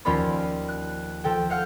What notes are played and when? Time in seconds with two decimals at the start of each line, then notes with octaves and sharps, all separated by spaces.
0.05 D#2 F3 C#4 F4 D5 B5
0.69 F#6
1.24 F3 A4 G5
1.50 F5 F#5 F6 G6